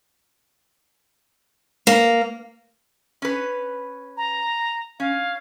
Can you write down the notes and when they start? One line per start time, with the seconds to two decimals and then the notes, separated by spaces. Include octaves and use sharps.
1.87 A#3
3.22 C#4 B4
4.17 A#5
5.00 C#4 F5